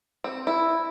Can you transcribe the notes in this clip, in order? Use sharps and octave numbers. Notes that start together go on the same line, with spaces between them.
C4
E4